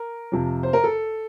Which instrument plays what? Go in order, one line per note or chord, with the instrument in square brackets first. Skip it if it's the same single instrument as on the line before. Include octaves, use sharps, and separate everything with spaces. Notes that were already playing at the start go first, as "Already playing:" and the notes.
Already playing: [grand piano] A#4
F2 C3 F3
C5
A#4
A4